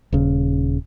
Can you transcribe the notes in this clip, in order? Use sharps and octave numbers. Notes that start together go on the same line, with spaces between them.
D#1 C#3